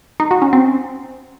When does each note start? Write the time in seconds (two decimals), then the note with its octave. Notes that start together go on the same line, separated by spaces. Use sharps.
0.20 D#4
0.31 F#4
0.42 C#4
0.53 C4